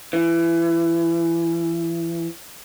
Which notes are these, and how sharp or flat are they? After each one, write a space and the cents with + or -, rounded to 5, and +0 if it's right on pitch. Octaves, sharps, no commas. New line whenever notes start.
E3 +25